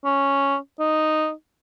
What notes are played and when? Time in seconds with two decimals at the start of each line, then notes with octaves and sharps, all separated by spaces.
0.05 C#4
0.79 D#4